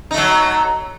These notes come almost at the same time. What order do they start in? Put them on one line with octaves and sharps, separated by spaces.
D#4 A3 F#3